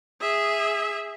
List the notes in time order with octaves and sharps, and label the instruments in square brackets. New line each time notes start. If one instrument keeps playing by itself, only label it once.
[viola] G#4 E5